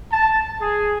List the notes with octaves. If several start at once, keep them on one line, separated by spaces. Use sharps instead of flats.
A5
G#4